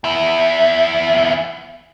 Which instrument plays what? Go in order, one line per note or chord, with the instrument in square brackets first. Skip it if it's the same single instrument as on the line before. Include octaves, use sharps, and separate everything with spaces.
[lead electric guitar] E2 E4